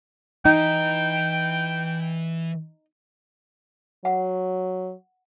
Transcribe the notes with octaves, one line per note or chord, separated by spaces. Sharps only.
E3 D#4 G5
F#3 F#5